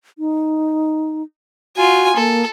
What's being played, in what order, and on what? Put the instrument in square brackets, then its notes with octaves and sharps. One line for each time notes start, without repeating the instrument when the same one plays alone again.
[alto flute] D#4
[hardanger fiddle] F4 G#5 [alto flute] F#4
[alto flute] A#3 [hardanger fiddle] A4